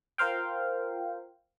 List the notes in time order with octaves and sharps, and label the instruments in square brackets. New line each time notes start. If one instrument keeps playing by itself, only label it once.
[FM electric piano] F4 A#4 C5 F5 G5